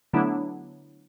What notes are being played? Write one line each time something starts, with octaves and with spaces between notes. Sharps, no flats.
D3 F#3 A3 B3 D4 E4